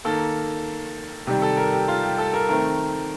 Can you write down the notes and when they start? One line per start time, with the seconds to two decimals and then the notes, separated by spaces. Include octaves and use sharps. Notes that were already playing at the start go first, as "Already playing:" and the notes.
0.05 D#3 A#3 A4
1.27 C3 D#3 G3 G4
1.42 A4
1.57 A#4
1.72 G4
1.88 F4
2.03 G4
2.18 A4
2.33 A#4
2.49 D#3 A3 C4 A#4